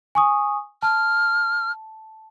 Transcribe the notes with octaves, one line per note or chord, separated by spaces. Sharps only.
G#5 C#6 D#6
A5 F6